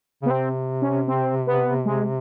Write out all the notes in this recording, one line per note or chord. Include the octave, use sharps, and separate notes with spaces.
C#3
B3
C3 C4
C#4
C4
B3
G#3